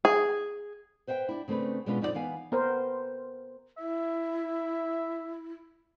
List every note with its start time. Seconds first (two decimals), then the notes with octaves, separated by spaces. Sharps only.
0.05 G#4
1.07 B4 C5 E5 F#5 G5
1.29 D4 E4
1.48 C#3 A3 C4 D4 B4
1.86 B2 G#3 C#4 D4 F4 B4
2.02 F2 D#4 F4 G4 D5
2.14 E3 B3 F5 G#5
2.52 B3 A#4 C5
3.79 E4 E5